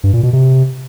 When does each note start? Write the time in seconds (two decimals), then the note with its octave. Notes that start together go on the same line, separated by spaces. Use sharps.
0.04 G2
0.13 A#2
0.23 B2
0.33 C3